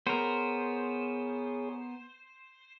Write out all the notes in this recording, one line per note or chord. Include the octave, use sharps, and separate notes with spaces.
B3 G#4 A#4 C5 C#5